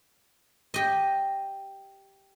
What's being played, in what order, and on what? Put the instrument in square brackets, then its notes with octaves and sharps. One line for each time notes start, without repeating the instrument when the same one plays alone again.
[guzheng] G4 D#5